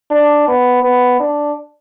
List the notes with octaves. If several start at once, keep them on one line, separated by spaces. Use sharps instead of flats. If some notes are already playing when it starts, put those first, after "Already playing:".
D4
B3
B3
D4